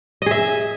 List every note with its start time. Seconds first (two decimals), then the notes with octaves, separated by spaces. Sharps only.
0.22 D#5
0.26 G#4
0.31 E5